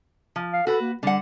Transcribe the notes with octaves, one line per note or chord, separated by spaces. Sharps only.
F3
F5
F#4 A4 B4
A#3
D3 G3 F#5